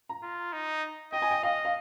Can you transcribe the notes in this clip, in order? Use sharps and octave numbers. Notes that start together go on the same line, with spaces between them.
A#5
F4
D#4
D#5 G5
G#5
G5
D#5 F5
F5